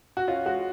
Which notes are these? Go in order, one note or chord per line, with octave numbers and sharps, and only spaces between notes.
F#4
C#4 F4
G#3 F#4